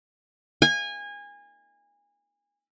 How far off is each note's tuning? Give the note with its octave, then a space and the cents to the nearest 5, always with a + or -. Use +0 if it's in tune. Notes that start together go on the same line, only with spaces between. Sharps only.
G#5 -25